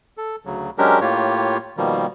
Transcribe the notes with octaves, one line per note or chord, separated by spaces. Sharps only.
A4
D2 C#3 F#3
F#3 G#3 C#4 D4 G4 A#4
A2 A#3 F4 G4 C#5
B2 D#3 F3 G3 A#3